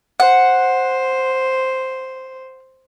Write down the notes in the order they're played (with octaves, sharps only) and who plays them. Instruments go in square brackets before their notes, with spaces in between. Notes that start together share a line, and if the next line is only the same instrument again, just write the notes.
[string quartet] C5 [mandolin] F#5